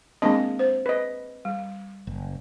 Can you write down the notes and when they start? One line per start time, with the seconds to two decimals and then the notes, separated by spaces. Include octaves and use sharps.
0.22 G#3 A#3 C4 D4 D#5 A5
0.59 C5
0.86 B4 D#5
1.45 G3
2.07 F#1